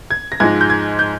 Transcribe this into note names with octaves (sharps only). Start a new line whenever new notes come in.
G#6
A#6
G#2 F3 G#3 D#4 G#6
G6
G#6
G6